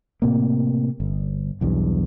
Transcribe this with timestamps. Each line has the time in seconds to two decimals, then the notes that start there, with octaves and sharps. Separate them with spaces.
0.22 A2 C3 A#3
1.00 G1
1.61 B1 E2 G2